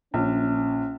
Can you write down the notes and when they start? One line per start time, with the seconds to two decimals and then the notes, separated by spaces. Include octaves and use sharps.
0.14 A#1 C#4